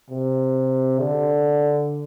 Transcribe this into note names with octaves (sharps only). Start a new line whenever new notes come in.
C3
D3